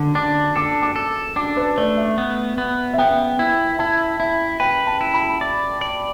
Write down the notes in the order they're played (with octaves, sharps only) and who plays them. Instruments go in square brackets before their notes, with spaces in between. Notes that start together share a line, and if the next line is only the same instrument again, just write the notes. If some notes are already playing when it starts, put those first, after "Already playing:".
Already playing: [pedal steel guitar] D3 [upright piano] D6
[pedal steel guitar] D4 [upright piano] D6
[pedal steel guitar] A4 [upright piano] D6
[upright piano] D6
[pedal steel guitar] A4
[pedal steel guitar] D4 [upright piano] D6
[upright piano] B4
[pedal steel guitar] A3 [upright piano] D5
[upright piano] E5
[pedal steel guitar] B3
B3
[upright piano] E5
[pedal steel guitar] B3 [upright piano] G5
[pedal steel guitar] E4
[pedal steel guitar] E4 [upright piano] A5
[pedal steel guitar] E4 [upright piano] E5
[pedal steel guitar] B4 [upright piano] G5
[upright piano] A5
[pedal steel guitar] E4
[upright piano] B5
[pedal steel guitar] D5
D5